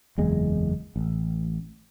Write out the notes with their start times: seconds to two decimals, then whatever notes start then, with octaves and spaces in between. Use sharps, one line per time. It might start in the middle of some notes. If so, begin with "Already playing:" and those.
0.18 F#1 E2 G#3
0.96 A1